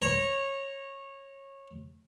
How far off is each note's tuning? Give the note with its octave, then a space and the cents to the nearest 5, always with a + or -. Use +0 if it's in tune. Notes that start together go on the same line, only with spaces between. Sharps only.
C#5 -20 A#5 +0